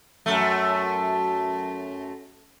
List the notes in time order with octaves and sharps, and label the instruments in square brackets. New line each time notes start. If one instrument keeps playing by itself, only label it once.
[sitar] F#2 A3